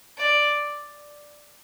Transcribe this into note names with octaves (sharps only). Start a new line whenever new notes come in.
D5